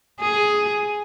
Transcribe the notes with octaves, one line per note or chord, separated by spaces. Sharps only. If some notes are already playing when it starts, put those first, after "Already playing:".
G#4